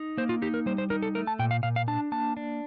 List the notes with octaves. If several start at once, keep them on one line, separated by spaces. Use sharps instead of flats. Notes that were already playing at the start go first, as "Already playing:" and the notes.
Already playing: D#4
A#3 C5
F4
D#4 G4
A#4
G3 C5
C5
D#4 A#4
A4
A3 A#4
A5
A#2 G5
F5
A#2 F5
F5
D4 A5
A#3 A5
D4